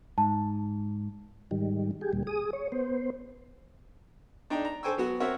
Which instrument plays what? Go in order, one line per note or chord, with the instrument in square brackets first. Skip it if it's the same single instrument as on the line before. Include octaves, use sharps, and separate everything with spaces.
[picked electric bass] G#2 [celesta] A5
[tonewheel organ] G#2 D#3 G3
G4 G#4
D2 A#2 G3
G#4 D#6
C#5
B3 C5
[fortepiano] D4 D#4 G5 A#5
A#5
A4 C5 G5 G#5 C#6 E6
F#3 B3 F#4
C4 F#4 A#4 C#5 E5 F#5